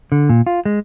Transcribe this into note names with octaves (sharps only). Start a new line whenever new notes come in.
D3
A#2
F4
G#3